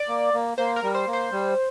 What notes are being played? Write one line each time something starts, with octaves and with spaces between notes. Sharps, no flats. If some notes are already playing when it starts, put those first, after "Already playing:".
Already playing: D5
A#3
A#3
A#3 C5
A#4
G3
C5
A#3
C5
G3